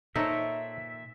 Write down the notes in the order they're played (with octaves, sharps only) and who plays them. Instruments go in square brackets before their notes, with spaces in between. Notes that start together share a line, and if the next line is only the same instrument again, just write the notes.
[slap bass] A#2 [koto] D#4 [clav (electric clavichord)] A4 C5 C#5 [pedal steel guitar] E5